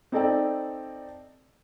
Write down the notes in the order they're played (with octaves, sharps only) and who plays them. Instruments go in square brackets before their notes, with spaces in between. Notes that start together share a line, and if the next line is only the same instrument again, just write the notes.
[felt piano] C4 D#4 A4 D5 G5